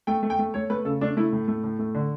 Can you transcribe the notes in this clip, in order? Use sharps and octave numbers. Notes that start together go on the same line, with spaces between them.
A3 G5
A3
G5
A3
A3 C#5
A3 B4
C#3 A4
A3 D4
A3 E4
A2
A3
A2
A3
D3